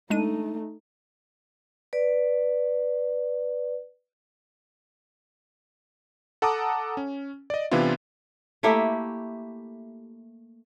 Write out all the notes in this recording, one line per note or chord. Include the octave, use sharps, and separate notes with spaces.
G#3 A3 D4 D#4 D#7
B4 D5
A4 F#5 A5 A#5 D6 D#6
C#4
D5 D#5
C3 E3 B3 D4 E4 F4
A3 A#3 E4 G4